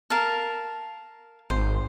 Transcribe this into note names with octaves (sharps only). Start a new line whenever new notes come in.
A#4 F5 A5
G#1 C5